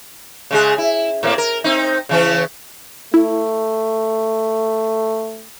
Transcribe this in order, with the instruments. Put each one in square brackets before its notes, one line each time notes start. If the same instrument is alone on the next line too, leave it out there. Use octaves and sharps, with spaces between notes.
[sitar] C#3 G#3 G#4
E4
A2 A#3 C4
A#4
C4 D#4
C#3 E3 C#4
[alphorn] A3 [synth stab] E4